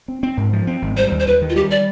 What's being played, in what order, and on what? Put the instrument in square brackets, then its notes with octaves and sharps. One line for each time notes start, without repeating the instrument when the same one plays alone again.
[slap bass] C4
C4
G#2
F3
C4
G#1
[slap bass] G3 [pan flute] C5
[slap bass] D#2
[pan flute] C5
[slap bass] D#2 [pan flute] B4
[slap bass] D#3
[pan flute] F4
[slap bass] G3 [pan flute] G4
[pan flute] D5